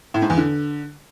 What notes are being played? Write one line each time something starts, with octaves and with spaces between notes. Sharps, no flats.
A2
G#2
E2
D3